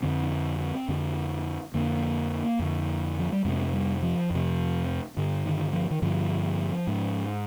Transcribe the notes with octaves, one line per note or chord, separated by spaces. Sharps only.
F2 D3 C4
F2 D3
F2 D3 A#3
F2 D3
F3
G3
F2 C3 G#3
G3
F3
F2 C3
G2 D3
D#3
F3
D#3
G2 D3 F3
G#2